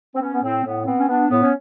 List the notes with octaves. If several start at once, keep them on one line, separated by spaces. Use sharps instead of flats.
C4
B3 C#4
B3
A2 C4
A2 B3
B3 C4
C#4
B3 D4
A2 B3
C#4